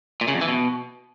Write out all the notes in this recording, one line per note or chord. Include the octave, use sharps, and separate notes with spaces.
A#2
C#3
F2
E3
B2